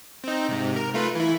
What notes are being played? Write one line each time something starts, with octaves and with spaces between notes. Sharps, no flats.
C4 D#4
G#2 C3
A#4
A3 F4 B4
E3 E4